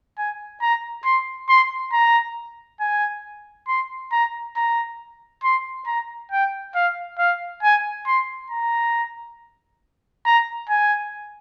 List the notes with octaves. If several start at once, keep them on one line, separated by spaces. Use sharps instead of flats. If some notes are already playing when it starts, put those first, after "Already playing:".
G#5
A#5
C6
C6
A#5
G#5
C6
A#5
A#5
C6
A#5
G5
F5
F5
G#5
C6
A#5
A#5
G#5